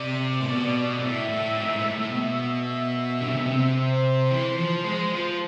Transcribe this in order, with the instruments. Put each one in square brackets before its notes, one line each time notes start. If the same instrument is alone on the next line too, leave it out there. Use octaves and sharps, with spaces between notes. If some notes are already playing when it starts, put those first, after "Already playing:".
Already playing: [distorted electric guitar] C3 [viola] D5
[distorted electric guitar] A2
B2
G#2
[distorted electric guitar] A2 [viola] E5
[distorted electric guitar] A2
G#2
A2
G#2
A2
[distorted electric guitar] B2 [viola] E5
[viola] E5
[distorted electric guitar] D3
C3
B2
C3
[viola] C5
[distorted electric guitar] E3
F3
G#3
F3